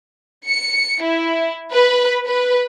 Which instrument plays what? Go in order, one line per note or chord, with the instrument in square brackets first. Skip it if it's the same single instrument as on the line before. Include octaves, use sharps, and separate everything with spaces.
[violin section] C#7
E4
B4
B4